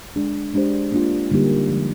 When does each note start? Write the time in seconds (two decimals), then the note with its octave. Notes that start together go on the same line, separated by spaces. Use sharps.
0.16 G#3 D4 G#4
0.54 G#3 D4 G4 C5
0.92 A#3 D4 F4
1.32 D3 G3 A#3 D#4 G4
1.69 D3 F3 G#3